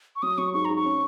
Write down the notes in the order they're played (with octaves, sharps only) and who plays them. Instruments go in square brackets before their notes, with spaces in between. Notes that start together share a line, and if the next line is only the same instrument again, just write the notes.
[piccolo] C#6
[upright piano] F#3 [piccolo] D#6
[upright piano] F#3 [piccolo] C#6
[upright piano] G#2 [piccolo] C#6
[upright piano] G#2 [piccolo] A#5
[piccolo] C#6
[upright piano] C#4